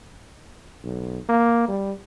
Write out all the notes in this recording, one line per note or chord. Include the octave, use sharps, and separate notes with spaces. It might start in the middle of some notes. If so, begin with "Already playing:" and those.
B1
A#3
G3